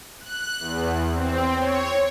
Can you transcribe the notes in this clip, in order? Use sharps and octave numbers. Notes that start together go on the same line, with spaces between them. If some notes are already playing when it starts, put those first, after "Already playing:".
F#6
E2
C4
C#5